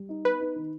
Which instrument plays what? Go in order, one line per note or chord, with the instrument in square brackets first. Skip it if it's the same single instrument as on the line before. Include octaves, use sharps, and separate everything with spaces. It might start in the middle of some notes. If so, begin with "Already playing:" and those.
Already playing: [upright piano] G3
D#4
[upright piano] B3 [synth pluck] B4
[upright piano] D#4
D#3